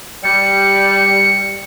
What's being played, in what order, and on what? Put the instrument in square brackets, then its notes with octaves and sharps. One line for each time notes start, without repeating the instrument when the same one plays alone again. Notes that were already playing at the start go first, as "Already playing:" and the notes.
[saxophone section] G3 [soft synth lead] C#7